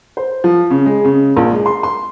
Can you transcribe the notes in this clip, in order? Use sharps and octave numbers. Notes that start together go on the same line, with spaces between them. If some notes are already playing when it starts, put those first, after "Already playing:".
C5
F3
C#3
G#3
C#3
A#1
G#3
C6
C6